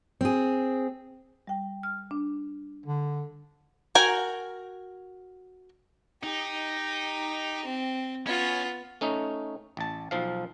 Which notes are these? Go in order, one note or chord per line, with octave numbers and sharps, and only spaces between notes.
C4 G#4
G3 G5
F6
D4
D3
F#4 A#4 G5 G#5
D#4 G4
C4
B3 C#4 F4
A3 C#4 D#4
A1 A5
B1 F3 F5